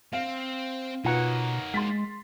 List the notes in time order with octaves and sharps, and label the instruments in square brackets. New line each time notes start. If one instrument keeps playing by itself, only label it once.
[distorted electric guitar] C4 [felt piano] F5
[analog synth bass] B2 [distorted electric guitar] A#3 C#5 [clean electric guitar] D#4 F#5 [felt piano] F4 B4
[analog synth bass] G#3 [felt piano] C6 A6 B6